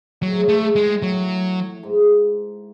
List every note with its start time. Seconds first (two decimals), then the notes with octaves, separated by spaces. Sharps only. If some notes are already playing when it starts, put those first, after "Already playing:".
0.21 A2 F#3
0.29 G#2
0.36 A2
0.48 G#2 A3
0.75 A2 G#3
1.02 A2 F#3
1.83 G#2